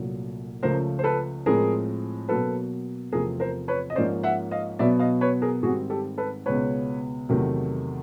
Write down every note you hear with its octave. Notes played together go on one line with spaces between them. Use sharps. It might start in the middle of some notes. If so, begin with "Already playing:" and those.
Already playing: C2 A#2 F#3 A3
C#2 C#3 F3 A3 A#4 C5
C5
A4 B4
A2 F3 G#3 C4 G#4 A#4
B2 F#3 A#3 A4 B4
E2 C3 F3 A3 C4 G#4 A#4
A#4 C5
B4 C#5
D#5
G#2 F3 A#3 C#4 C5 D5
E5 F#5
D#5 F5
B2 F#3 B3 D5 E5
D#5 F5
B4 C#5
G#4 A#4
G#2 D#3 G3 C4 F#4 G#4
G4 A4
A4 B4
C#2 B2 G#3 B3 B4 C#5
E2 C3 D#3 F#3 A3